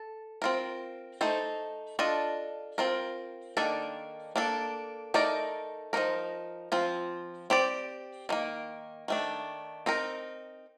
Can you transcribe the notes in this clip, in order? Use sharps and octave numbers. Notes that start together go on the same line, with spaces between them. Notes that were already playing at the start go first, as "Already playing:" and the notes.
Already playing: A4
C4 F4 A#4
A3 D#4 A4 C5
D4 F4 A4 D#5
C4 F4 A#4
D#3 A#3 D4 A4 D5
A#3 D4 A4
A3 D#4 A#4 D5
F3 A#3 D#4 A#4
F3 C4 F4
C4 G4 D5
D#3 G3 A#3
D#3 A3 D4
C4 D#4 A#4